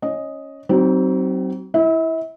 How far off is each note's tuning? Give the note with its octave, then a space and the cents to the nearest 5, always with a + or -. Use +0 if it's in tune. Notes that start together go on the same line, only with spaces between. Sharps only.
C#4 -5 D#5 +0
F#3 +40 C4 +0 D#4 +0
E4 +0 E5 -40